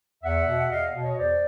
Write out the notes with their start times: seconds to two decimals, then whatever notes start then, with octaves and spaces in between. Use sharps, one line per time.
0.23 E2 E5 F#5
0.48 B2
0.71 E2 D#5 F5
0.95 B2
1.02 C#5 D#5
1.18 E2 C5 D5